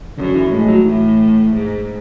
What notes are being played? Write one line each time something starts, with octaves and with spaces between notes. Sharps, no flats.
F#2 D3
E3
A2 G#3
F#3
A2 E3
G#2